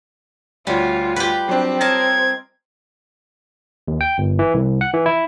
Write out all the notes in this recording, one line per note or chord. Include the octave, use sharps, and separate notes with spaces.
D2 G3 F4 F#4 C#5
G4 B4
F#3 C4 D4
A#4 C#5 D#5 A5 G#6
D#2
G5
G1
E3
C2
F#5
E3
E4